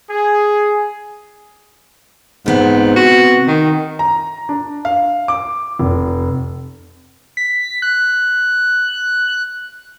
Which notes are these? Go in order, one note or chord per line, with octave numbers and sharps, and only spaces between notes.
G#4
G#2 C3 B3 C4
F#4
D#3
A#5
D4
F5
D6
F1
B6
F#6